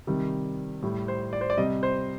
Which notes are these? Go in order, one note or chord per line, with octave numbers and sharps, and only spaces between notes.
C3 D#3 G3
A2 G3
C5
D5
C5
D5
C3 G3 D#5
C5